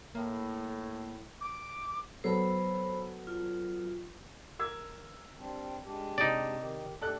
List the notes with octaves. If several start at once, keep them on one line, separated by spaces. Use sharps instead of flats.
A2 A#3
D6
F#3 B3 A4 C5 B5
F4
A#4 E6 G#6
G3 C4 D4
G#3 D4 G4
C3 C4 D#4 D5
D#3 G4
A3 D4 G4 A4 D5 F#6